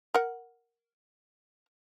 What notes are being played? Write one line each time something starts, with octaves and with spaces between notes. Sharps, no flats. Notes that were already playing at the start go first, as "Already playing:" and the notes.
A#4 F#5